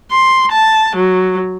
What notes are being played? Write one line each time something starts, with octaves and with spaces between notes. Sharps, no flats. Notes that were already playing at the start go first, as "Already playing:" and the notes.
C6
A5
F#3